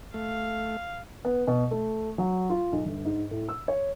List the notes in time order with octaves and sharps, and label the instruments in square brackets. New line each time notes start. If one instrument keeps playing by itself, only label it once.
[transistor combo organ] A3 [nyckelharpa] F5
[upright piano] B3
B2
A3
F#3
F4
B1
G1
G#2
A2
E6
C#5